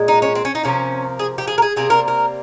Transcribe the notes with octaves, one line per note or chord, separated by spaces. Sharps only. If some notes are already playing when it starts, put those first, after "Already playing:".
Already playing: A#2 G#3
D#4
C#4
C4
C#4
D#4
C3 F3 A#3 C#4
G#4
G4
G#4
A#4
G#4
C3 G3 A#3 G#4
A#4
A#4